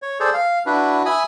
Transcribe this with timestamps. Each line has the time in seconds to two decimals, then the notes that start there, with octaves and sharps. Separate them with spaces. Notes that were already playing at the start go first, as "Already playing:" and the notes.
0.02 C#5
0.20 G#4 A4 C5 D5
0.33 F5
0.66 D4 E4 F#4 B4
1.05 E5 G#5 B5 D#6